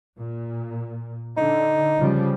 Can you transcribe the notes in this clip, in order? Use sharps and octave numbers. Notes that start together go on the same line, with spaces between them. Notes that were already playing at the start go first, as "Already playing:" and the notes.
A#2
D3 D#4
C#3 F3 G3